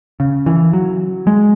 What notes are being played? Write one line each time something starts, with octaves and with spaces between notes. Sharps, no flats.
C#3
E3
F#3
G#3